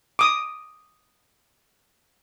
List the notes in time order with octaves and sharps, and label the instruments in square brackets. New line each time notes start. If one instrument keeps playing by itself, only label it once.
[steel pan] D6 D#6